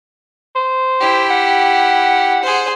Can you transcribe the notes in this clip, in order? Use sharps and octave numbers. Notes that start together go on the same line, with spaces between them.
C5
E4 G4
F#5
G#4 C5